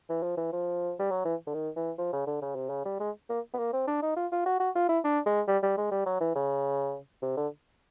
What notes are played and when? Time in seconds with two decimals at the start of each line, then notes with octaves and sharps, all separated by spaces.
0.09 E3
0.23 F3
0.37 E3
0.52 F3
0.99 G3
1.11 F#3
1.25 E3
1.47 D3
1.54 D#3
1.76 E3
1.98 F3
2.13 C#3
2.27 D3
2.42 C#3
2.55 C3
2.69 C#3
2.86 G3
3.00 G#3
3.30 A#3
3.54 B3
3.59 A#3
3.73 C4
3.88 D4
4.02 D#4
4.17 F4
4.32 F4
4.46 F#4
4.60 F#4
4.76 F4
4.89 E4
5.04 D4
5.26 G#3
5.47 G3
5.63 G3
5.77 G#3
5.91 G3
6.06 F#3
6.21 E3
6.36 C#3
7.22 C3
7.37 D3